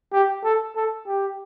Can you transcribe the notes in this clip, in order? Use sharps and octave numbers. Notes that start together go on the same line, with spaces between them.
G4
A4
A4
G4